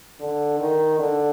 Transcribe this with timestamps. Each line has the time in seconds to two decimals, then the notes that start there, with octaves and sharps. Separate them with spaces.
0.20 D3
0.59 D#3
0.99 D3